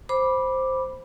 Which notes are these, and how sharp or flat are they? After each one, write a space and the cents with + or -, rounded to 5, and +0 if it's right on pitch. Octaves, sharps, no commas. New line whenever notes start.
C5 +0 B5 -10 D6 +0